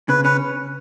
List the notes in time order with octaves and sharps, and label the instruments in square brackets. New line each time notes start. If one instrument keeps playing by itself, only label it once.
[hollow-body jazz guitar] C#3 [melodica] B4
[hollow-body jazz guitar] C#4 [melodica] B4